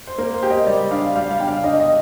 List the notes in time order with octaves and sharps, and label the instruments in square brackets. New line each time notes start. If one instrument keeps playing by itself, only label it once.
[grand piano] C5
[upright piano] A#3 [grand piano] A#4
[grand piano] C5
[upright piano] G4
[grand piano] D#5
[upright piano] G3 [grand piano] D5
[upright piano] D4 [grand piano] F5
[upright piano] G3 [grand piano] F5
[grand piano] F5
[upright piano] D4 [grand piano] G5
[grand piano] F5
[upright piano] D4 [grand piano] D#5
[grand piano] D#5